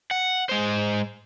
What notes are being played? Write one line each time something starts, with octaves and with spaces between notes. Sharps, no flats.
F#5
G#3 C5